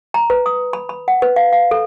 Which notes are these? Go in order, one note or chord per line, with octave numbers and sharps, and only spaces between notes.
A#5
B4
D#6
B5
B5
F#5
B4
F5
F5
A4